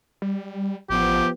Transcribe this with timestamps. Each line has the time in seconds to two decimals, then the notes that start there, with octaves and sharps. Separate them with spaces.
0.22 G3
0.90 A1 F3 B3 G4